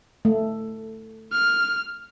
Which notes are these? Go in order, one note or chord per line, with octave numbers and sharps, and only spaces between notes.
A3
F6